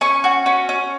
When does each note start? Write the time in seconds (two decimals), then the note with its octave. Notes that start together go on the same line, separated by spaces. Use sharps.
0.01 C#4 G#5 C#6
0.24 F#4
0.46 C#4
0.69 C#4